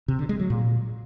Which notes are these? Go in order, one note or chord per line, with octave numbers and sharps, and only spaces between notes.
C3
D3
G#3
F#3
A#2